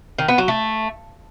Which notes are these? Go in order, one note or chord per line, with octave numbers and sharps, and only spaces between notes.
D#3
B3
F#3
A3